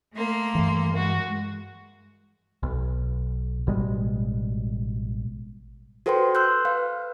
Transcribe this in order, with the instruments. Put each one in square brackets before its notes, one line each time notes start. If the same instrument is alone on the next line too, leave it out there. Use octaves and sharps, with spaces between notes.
[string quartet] A3 A#3 C6
[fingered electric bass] G2 E3
[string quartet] G#3 F#4
[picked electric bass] B1
A1 B2 G3 G#3
[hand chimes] F#4 A4 B4 C5 G5 C6
C6 E6 F#6 G6
B4 F5